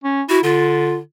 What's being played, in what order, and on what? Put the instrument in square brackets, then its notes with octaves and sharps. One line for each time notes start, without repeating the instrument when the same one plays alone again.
[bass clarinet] C#4
[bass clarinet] E4 [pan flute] F#4
[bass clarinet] D3 [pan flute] F4